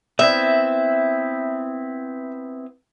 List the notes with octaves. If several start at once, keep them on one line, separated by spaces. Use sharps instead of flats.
B3 C4 E4 E5